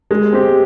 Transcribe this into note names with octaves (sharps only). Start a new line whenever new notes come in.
G#3
C4 G4